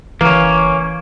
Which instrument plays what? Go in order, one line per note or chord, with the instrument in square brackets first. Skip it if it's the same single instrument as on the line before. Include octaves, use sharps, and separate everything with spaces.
[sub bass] F#1 [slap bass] E3 [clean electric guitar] A#3 C#4